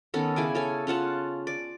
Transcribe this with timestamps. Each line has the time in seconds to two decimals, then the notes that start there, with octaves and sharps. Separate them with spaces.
0.14 D#3 B3 C#4 A4
0.36 C#3 E4 G#5 D6
0.55 C#4 A4 C#5 G#5
0.87 C#4 F4 F#5 A5
1.47 D5